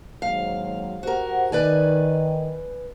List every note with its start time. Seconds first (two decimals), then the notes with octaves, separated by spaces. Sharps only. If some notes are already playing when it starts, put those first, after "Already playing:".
0.22 D#2 G#2 F#3 F5
1.03 F#4 G4 A#4 C5 F#5
1.52 D#3 B4 D5 G#5